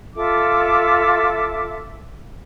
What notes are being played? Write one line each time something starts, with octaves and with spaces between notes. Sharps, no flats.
F4 A4 E5 D6